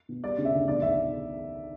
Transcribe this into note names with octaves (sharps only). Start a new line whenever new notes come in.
B2
G3 D5
C#3
E5
D2
B1 D5
B1 E5